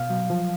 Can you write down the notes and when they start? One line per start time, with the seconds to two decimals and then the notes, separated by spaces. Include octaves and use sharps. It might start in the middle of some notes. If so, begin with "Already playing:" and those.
Already playing: B2 F5
0.10 F#3
0.30 F3